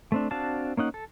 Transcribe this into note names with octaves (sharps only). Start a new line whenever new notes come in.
A3 C4 D4
C4 D4 F#4 F5 A5
A#3 C#4 D#4 F#5
A4